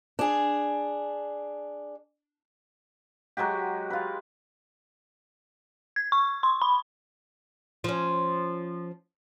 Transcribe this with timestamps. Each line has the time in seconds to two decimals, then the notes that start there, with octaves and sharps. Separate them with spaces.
0.19 D4 G#4
3.37 F#3 G#3 F#4 G4
3.90 F4 B4
5.96 G#6
6.12 C#6
6.43 C6
6.62 B5
7.84 F3 C#4